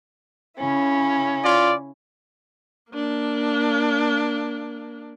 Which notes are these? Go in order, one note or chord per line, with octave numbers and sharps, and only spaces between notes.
C#3 C#4 E4
F4 D5
A#3 D4